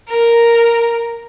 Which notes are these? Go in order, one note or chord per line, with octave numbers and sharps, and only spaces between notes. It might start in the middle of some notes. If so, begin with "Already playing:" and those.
A#4